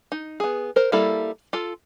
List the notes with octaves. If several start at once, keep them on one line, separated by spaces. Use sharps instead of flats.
D#4
B3 G#4
A#4 C5
G3 A#3 E4 A4 B5
F4 A4